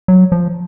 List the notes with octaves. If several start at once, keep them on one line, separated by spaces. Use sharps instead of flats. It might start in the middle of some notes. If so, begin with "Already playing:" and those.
F#3
F3